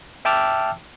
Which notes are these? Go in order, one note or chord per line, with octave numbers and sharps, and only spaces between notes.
E5 G5 A5 D6 E6 F6